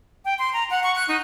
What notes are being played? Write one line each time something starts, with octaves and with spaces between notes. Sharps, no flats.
G5
C6
A#5
F#5
C#6
F#6
D#4